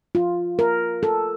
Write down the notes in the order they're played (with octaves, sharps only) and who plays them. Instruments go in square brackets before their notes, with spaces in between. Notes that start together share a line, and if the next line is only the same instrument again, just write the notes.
[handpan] F4
A#4
A4